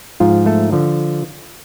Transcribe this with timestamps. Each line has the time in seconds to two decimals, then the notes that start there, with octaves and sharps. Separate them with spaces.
0.20 G#2 F3 F4
0.46 A3 A4
0.72 D3 F3